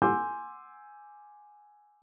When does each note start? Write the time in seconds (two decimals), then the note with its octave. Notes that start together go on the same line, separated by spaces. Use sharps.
0.02 F#5 G#5 C6 D6 E6 G6